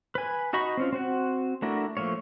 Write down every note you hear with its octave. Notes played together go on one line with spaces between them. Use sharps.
B4 G#5
D#4 F#4 D#5 B5 C#6
C4 C#4 F4
C4 F#4 F#5
A3 D4 E4 F#4 A#4
F3 A3 A#3 C#5